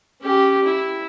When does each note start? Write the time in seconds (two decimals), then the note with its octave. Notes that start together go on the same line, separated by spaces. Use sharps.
0.21 C#4 G4
0.64 E4